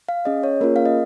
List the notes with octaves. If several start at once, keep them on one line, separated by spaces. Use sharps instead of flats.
F5
C#4 G#4 D#5
C#5
A#3 C#4 F4 G#4 A#4
F5
D#5